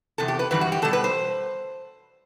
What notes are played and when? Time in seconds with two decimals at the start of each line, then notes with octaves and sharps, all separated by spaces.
0.18 E2 C3 A4
0.28 G4
0.39 B4
0.51 F#2 E3 G3 B4
0.61 F#4
0.72 G4
0.82 B2 G3 A4
0.93 B4
1.04 C5